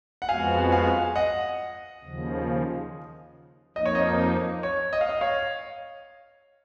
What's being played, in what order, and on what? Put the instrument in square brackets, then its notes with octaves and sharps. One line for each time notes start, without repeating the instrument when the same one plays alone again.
[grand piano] F#5
[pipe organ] F2 F3 G#3 B3 F#4 [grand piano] F5 G#5
[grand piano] F5 G#5
D#5 F#5
[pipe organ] D#2 C#3 F3
[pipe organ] F2 F3 A#3 D#4 [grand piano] D#5
[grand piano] C#5
D#5
C#5
D#5
F5
D#5
C#5 F5